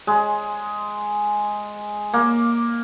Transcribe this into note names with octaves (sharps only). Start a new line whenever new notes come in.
G#3
A#3